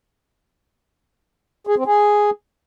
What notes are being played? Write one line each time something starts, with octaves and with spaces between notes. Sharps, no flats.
G#4
C4
G#4